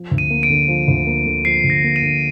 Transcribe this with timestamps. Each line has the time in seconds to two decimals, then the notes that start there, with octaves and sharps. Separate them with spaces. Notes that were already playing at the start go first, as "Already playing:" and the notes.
Already playing: F3
0.11 D2
0.18 D#7
0.30 A#3
0.43 D7
0.50 D3
0.68 F3
0.88 D2
1.06 A#3
1.26 D3
1.45 F3 C7
1.64 D2
1.70 A#6
1.84 A#3
1.96 D#7
2.02 D3